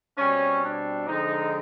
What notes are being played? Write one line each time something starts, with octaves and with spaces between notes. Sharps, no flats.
B2 G3 C4 C#4
D4
D3 F3 G#3 C4 D#4